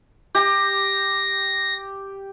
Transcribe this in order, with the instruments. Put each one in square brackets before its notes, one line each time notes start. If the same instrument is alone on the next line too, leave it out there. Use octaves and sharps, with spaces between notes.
[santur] G4 [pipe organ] A#6